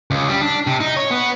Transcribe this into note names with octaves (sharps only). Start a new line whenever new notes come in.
C#2
G3
D4
C3
D#4
C#5
B3